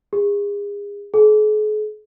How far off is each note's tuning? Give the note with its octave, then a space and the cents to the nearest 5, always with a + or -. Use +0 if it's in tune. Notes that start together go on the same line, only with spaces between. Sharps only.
G#4 -35
G#4 +45